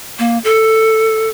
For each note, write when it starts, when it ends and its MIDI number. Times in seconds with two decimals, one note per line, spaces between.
0.19 0.38 58
0.44 1.29 69